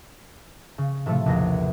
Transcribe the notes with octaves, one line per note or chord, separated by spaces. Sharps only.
C#3
A2 C3 F3 A3
A#1 E2 A#6